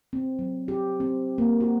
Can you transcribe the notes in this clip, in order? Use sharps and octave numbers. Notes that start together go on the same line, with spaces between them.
C4
F#3
G4
C4
A#3
F#4